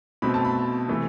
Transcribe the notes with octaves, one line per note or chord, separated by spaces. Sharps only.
B2 A3 C4 B5
A5
B5
C3 E3 A3